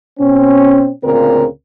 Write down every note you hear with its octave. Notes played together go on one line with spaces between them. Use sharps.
B2 C4 C#4
D2 A#2 C#3 C4 A#4